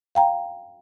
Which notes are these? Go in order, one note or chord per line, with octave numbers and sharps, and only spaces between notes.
F5 G5 A#5